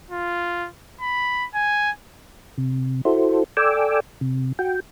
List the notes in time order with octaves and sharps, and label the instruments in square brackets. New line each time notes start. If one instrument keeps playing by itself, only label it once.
[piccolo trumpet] F4
B5
G#5
[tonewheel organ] C3
E4 F#4 A4 C5
A4 D5 G5 G#5 D6 E6
C3
F#4 G5